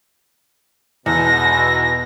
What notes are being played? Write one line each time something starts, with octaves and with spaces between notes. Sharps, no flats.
E2 B2 G#3 D#4 A4 A#6